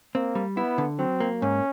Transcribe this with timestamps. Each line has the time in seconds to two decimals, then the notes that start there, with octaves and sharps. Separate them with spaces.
0.15 A#3 C4
0.35 G3
0.57 B3 E4
0.78 D3
0.99 F#3 C4
1.20 A#3
1.42 G#2 C#4